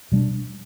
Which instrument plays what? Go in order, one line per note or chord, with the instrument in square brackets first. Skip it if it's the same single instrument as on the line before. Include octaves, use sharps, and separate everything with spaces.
[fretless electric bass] B2 G3 A#3 D4